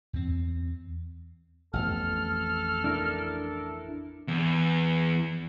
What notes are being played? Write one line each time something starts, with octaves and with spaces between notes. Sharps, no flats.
E2 C4
A1 F2 B3 A4 F6
D4 E4 A#4
E2